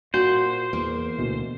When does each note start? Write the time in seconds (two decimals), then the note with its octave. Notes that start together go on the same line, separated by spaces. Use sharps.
0.14 A#2 F#4 C5
0.73 E2 A#3
1.18 D2 B2 E3